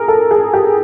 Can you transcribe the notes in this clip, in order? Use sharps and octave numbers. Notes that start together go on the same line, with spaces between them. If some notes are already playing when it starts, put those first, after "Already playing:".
Already playing: G#4 A#4
A4
G#4
G4